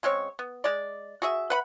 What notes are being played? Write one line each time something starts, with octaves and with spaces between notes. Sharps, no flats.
C#3 G#3 C4 C#5
B3
G#3 D5
F#4 G#4 E5
B4 F#5 B5